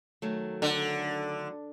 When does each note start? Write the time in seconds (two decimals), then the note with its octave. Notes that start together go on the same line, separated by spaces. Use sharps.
0.22 D#3 F#3 A3
0.62 D3